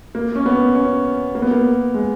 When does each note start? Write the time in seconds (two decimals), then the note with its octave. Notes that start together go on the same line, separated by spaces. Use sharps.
0.15 A#3
0.35 C#4
0.46 B3
0.75 C#4
1.35 A#3
1.42 B3
1.51 A#3
1.94 G#3